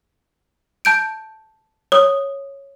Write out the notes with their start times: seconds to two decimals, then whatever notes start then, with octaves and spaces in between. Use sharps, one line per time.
0.85 A5 G6 D7
1.92 C#5 D#6